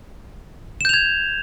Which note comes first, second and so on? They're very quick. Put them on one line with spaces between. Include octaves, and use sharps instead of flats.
E7 G6 F7 G#6